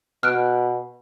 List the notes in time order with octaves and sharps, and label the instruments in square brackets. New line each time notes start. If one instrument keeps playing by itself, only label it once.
[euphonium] B2 [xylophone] F6 F#6 D7